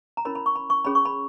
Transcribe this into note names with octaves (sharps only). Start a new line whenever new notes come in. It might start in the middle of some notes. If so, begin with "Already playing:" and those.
A#5
C#4 E4 A#4 C#5 B5
B5
C#6
B5
C#6
C#4 G#4 C#5 B5
C#6
B5